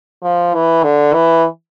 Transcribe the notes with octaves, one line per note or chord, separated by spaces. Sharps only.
F3
E3
D3
E3